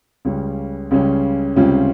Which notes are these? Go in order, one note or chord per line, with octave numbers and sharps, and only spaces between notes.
C#2 C#3 G3 C#4
C#2 C#3 G3 C#4
C#2 C3 G3 C#4 F4